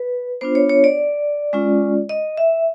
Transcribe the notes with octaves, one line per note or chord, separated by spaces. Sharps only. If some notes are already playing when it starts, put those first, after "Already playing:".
Already playing: B4
B3 D4 F4 C5
C#5
C#5
D5
G#3 C#4 F4
D#5
E5